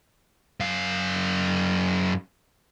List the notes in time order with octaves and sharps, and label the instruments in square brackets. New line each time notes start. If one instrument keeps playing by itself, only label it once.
[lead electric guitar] F#2 F5